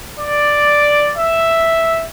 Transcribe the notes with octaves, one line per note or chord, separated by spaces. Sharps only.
D5
E5